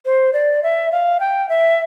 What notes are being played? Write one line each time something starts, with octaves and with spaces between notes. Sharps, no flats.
C5
D5
E5
F5
G5
E5